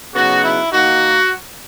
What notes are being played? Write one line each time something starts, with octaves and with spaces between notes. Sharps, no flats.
C#3 F#3 B3 D#4 F#4
E4
D#3 A#3 D#4 F#4